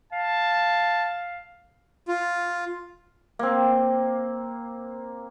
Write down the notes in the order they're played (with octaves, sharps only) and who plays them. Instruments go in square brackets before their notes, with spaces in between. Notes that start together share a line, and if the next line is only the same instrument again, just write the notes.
[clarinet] F5 [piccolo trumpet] A5
[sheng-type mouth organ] F4
[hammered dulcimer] A#3 C4